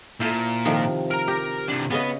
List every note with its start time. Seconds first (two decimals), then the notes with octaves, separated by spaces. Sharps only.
0.20 A#2 E4 C5 A5
0.65 C3 D#3 F3
1.11 A#4 A#5
1.28 G4
1.68 C3 D4
1.90 C#3 B3 C#4 D#5